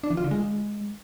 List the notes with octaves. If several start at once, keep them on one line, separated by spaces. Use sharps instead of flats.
D4
E3
F4
D3
G#3